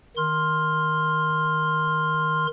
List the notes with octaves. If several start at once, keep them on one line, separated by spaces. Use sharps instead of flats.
D#3 C6 F6